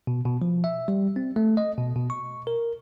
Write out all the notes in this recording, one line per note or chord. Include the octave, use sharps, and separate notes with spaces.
B2
B2
F3
E5
G3
C4
A3
D#5
B2
B2
C#6
A#4